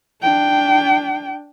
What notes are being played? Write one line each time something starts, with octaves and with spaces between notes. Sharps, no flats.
D4 G5